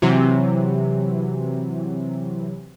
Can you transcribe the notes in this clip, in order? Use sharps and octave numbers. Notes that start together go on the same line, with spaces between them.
C3 E3 F#3